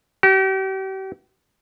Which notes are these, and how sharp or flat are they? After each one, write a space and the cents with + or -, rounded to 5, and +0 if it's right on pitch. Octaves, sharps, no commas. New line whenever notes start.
G4 -40